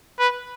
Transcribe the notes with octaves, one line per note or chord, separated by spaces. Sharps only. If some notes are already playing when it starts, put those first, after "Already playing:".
B4